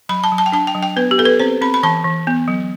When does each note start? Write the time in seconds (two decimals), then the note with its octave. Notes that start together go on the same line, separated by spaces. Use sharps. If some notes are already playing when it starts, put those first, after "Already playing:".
0.09 F#3 B5
0.24 A5
0.32 F#3
0.38 A5
0.46 G5
0.52 D4 A5
0.67 G5
0.75 F#3
0.83 G5
0.96 B3 B4
1.11 G4
1.18 B3 A4
1.25 B4
1.40 C4 C5
1.61 C4 B5
1.74 B5
1.83 E3 A5
2.05 E3
2.27 B3
2.48 F#3